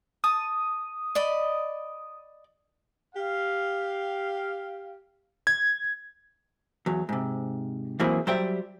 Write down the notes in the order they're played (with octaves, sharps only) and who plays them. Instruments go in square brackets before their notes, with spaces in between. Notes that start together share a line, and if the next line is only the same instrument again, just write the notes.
[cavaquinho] A5 [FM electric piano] D#6
[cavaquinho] D5 D#5 B5
[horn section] G4 F5
[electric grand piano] G#6
[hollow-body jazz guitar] E2 F#3
G#2 C3
E3 F#3 A#3 C4 E4 G#4
F#3 G3 C5 E5 G5